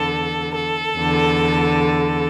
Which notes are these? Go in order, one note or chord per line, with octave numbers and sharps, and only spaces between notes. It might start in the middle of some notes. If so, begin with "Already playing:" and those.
Already playing: E2 D3 A4
A4
E2 D3